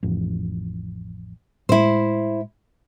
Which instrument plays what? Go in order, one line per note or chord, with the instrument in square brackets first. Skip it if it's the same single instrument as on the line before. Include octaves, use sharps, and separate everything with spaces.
[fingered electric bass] A1 F2
[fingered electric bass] A2 G#3 [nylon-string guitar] E4 C5